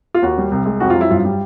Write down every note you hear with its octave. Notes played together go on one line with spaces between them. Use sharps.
F4
D#2 F#4
G3
C2
G#3
F2 F#4
F4
F#3
E4
G2 F4
G3